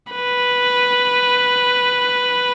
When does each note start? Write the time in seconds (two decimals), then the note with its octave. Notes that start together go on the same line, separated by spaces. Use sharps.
0.13 B4